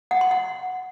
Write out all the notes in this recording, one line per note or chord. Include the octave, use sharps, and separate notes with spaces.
F#5
C6
F#5